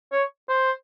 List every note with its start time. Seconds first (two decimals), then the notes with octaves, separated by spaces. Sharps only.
0.12 C#5
0.49 C5